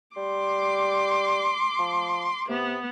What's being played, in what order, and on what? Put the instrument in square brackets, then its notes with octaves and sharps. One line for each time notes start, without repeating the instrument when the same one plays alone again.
[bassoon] G3 [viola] C6 D6
[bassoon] F3
[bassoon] C3 [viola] B3